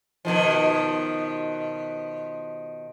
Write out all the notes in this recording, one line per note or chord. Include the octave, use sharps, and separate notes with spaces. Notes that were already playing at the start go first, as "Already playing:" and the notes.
B2 D#3 F3